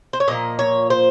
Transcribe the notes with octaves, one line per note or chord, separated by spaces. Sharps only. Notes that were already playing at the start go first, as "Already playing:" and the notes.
C5
C#5
A#2 F3 A#3 D#5
C#5
C5